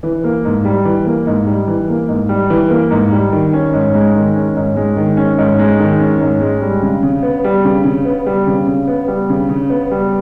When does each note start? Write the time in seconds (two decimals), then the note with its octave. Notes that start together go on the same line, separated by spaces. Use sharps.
0.03 E3
0.24 A#3
0.45 G#2
0.65 G3
0.85 E3
1.06 A#3
1.27 G#2
1.47 G3
1.68 E3
1.89 A#3
2.08 G#2
2.29 G3
2.50 E3
2.70 A#3
2.91 G#2
3.12 G3
3.32 D#3
3.53 C#4
3.73 G#2
3.95 G#3
4.15 D#3
4.35 C#4
4.56 G#2
4.76 G#3
4.97 D#3
5.17 C#4
5.38 G#2
5.59 G#3
5.80 D#3
5.99 C#4
6.21 G#2
6.41 G#3
6.62 G3
6.82 C#3
7.03 C#3
7.23 B3
7.44 G3
7.65 C#3
7.84 C#3
8.05 B3
8.26 G3
8.47 C#3
8.67 C#3
8.88 B3
9.08 G3
9.30 C#3
9.49 C#3
9.70 B3
9.91 G3